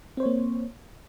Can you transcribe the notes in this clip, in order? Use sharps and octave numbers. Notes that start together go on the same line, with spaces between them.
A#3 C4 C5 C#5